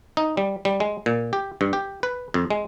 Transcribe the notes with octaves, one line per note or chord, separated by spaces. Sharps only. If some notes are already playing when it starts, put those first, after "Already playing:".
D#4
G3
G3
G#3
A#2
G4
G2
G4
B4
F2
G#3